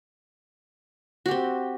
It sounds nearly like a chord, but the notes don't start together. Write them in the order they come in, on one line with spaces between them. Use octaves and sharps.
F#4 G4 C4